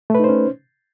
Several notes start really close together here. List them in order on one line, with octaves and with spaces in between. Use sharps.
A3 B4 D#4 C5 C#4